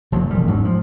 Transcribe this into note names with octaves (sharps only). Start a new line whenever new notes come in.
F#1 F3 F#3
E1 G3
G#2 F#3
F3